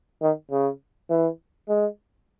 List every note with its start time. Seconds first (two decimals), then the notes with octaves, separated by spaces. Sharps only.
0.22 D#3
0.51 C#3
1.10 E3
1.69 G#3